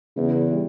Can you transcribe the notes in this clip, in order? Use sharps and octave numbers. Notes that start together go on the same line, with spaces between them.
E2 C#3
G3